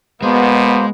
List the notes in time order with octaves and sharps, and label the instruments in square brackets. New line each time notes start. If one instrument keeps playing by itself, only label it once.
[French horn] B2 [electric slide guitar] G#3 [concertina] A#3 C5 [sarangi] B3